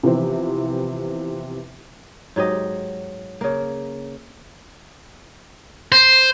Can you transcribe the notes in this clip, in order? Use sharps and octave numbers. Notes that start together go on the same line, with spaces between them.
C3 E3 F3 B3 C4
G#2 F#3 G4 D#5
C#3 A#3
C5